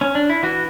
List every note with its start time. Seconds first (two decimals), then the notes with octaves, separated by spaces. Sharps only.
0.01 C#4
0.15 D4
0.30 E4
0.43 E3 F#4